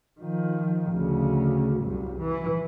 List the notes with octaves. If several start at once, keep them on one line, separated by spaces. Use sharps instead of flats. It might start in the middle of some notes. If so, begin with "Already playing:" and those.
D#3 F3
D2 C#3
C2 F#2
E3